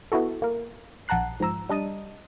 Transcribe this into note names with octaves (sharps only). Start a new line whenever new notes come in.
B3 E4 F#4 A4
A#3 A#4
A#1 F#5 A5 A#5 F#6 C7
G#2 F3 A#5 E6
G3 D4 D#5 A5 D#7